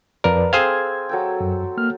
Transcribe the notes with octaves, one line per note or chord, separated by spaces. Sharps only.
F2 A#4 B4 D5 F5 A5 A#5
C4 G#4 A4 C5 F5 G#5 G#6
F#3 A4 G5
F#2
A#3 F6